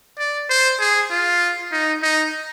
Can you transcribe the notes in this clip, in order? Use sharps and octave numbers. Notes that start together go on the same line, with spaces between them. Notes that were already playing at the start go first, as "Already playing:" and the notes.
D5
C5
G#4
F4
D#4
D#4